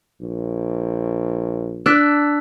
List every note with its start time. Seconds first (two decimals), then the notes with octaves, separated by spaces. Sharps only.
0.22 A#1
1.86 D4 E6 F#6 B6